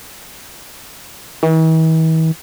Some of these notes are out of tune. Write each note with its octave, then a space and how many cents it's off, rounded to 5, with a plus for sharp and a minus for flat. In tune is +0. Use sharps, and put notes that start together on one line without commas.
E3 -45